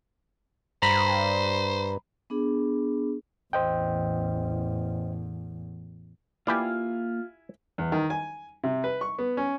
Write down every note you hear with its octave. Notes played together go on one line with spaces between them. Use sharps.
G2 C5 A#5 B5 B6
B3 D4 G#4
A1 E2 C5 D#5 G5
A#3 E4 F4 G4 B4 D5 F5 G#5
E2
D#3
G#5
C3
B4
C#6
B3
C#4